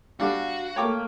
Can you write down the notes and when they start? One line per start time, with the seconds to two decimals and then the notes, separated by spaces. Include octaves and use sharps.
0.20 G3 D4 F#4 F5
0.76 A3 A#3 C#5 G5 D6